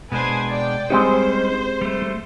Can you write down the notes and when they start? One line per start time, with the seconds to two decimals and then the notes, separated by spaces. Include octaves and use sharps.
0.12 B2 G#3 D4 B4 C5 G#5
0.49 D5 G5
0.90 G3 G#3 C4 C#4 D#4 G4 C5
1.81 G3 A3